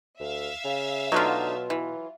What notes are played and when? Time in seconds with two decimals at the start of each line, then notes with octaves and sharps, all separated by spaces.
0.20 D2 E5 F5
0.65 C#3
1.12 B2 D3 F#3 A3 D#4 F4
1.70 E3